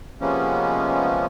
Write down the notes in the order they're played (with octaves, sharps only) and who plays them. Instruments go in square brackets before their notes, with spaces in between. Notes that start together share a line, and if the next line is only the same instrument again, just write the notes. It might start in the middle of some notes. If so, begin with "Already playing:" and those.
[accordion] C3 F3 G#3 A#3 B3 C#4